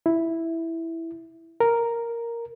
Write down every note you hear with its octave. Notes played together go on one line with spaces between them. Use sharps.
E4
A#4